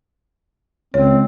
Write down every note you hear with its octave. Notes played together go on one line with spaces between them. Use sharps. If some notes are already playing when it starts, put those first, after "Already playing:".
C#2 C4 C#5